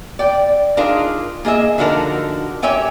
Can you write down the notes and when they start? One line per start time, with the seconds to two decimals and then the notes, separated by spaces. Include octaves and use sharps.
0.19 D5 G5
0.77 D4 D#4 F4 G#4 A#4
1.45 A#3 G#4 D#5 E5
1.78 D3 F3 D#4 F#4 A4 A#4
2.62 G4 A4 C#5 E5 G5 G#5